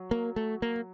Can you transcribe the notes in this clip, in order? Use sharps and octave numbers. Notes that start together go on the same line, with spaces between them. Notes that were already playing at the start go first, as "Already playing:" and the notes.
Already playing: F#3
A#3
A3
A#3